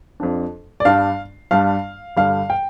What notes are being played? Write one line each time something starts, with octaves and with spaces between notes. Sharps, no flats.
F2 F3 D4
D5
G2 G3 D4 F5
G2 G3 D4 F5
G2 D3 G3 F5
G5